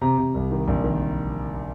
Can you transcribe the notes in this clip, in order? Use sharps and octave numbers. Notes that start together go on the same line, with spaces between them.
C3 A#5
C3
C2
D#3
A#1
D#3